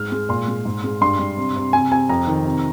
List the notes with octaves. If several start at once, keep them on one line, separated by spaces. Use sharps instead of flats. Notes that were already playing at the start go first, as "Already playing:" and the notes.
Already playing: G#2 F6
G#3
A#2 C6
G#3
G#2
G#3
G2 C6
G2
C3
C3
C3 G#5
C3 G#5
F2 A#5
D#3
C3